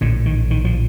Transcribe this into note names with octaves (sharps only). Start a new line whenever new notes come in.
A#1 A2 D3
D#3
D#3
F3